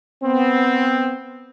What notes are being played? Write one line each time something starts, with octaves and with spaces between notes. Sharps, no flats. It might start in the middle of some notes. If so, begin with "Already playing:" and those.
B3 C4